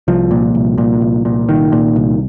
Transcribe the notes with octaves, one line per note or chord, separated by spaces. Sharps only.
C2 F3
A#2
C2
A#2
C2
A#2
C2 D#3
A#2
C2